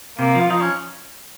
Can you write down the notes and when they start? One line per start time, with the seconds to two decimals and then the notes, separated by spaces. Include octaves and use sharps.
0.18 C3 A#3
0.35 F3
0.40 F4
0.50 F3 D#4
0.61 C#4